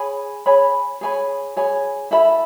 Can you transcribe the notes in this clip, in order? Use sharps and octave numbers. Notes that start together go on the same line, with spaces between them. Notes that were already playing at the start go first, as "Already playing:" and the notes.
Already playing: G#4 C#5 G#5 B5
G#4 C#5 G#5 B5
G#4 C#5 G#5 B5
G#4 C#5 G#5 B5
E4 A4 E5 B5